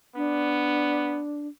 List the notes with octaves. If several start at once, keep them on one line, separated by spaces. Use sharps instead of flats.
B3 D4